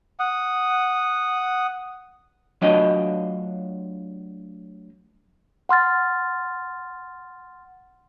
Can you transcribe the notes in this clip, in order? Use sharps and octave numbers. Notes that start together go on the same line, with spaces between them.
F#5 D#6
F#3 A3 D4 F4 D#5
F#5 C6 F6 A6